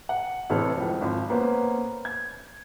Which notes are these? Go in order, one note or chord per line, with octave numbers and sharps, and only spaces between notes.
F#5
A1 C3 E3 A4 C#5 F6
C#2 F3
G#1 F2
A#3 B3 C#4 B4 C5
G#6